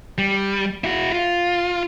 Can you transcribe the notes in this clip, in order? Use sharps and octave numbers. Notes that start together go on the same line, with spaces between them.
G3
E4 F#4
F4